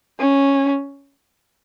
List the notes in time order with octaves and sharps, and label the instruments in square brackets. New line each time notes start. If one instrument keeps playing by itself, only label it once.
[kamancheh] C#4